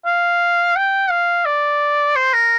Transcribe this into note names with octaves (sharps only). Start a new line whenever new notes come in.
F5
G5
F5
D5
C5
A#4